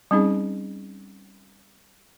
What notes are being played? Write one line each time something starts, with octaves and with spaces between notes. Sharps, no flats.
G3 C4 C#4 D#4 G#4